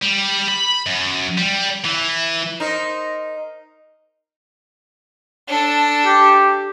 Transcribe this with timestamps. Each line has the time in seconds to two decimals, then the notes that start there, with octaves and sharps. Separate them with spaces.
0.03 G3
0.48 B5
0.86 F#2
1.38 G3
1.85 E3
2.60 D#4 A#4 C5
5.48 D4 A4
6.06 G4